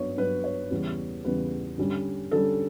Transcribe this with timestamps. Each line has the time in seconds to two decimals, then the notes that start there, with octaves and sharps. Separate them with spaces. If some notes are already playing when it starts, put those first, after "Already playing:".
Already playing: G2 F#3 B3 D4 C#5
0.17 G2 F#3 B3 D4 B4
0.44 C#5
0.71 E2 C#3 G3 B3
1.25 E2 C#3 G3 B3 B4
1.78 D3 G3 C#4
2.31 D3 G3 C#4 A4